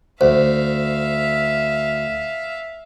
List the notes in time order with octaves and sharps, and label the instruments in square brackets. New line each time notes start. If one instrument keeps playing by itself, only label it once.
[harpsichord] D2 [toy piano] C5 [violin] E5 F5